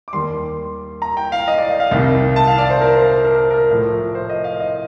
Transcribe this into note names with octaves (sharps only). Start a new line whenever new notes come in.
D6
D#2 D#3 G3 C6
A#5
G5
F5
D#5
D5
F5
F5
C2 C3 D#3 G3
A5
F5
D5
C5
A#4
C5
C5
A#4
A#4
A2 F3
C5
D#5
F5
D#5